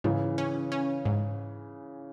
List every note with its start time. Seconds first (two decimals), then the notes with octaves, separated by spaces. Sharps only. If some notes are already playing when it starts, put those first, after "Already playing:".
0.04 G#2 C#3 E3
0.38 C#4
0.72 C#4
1.05 G#2